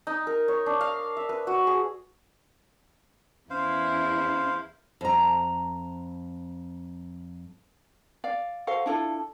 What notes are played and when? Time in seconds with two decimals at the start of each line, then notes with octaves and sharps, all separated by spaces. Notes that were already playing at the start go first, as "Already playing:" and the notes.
0.07 D#4
0.27 A#4
0.48 C#5
0.66 D4
0.81 F5
1.17 E5
1.29 B4
1.47 F#4
1.67 G#4
3.50 E2 C#4 E4 C5 F5
5.01 F2 A#5
8.24 D5 F5
8.67 F#4 A4 C5 F5
8.86 D4 E4 F4 A4